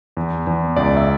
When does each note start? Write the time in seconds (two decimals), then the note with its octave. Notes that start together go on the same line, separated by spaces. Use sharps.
0.17 E2
0.47 E2
0.76 C#2 D5
0.97 E5